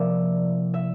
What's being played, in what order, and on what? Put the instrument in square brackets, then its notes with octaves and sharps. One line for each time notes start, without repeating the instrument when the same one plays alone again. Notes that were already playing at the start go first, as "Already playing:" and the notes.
Already playing: [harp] C3 F3 A#3 E4 D5 E5
E5